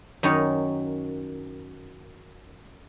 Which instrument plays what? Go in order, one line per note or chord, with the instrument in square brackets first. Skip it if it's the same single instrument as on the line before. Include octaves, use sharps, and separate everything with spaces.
[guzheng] F#2 D#3 D#4 C#5